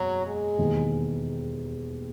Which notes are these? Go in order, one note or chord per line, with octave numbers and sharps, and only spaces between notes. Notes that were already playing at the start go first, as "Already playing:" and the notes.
Already playing: F#1 E2 B2 F#3 G#3
G#3
E1 D#2 D#3